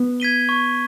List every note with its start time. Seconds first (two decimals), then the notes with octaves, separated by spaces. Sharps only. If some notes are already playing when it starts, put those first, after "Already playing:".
Already playing: B3
0.20 G#6 B6 D#7 G7
0.49 C#6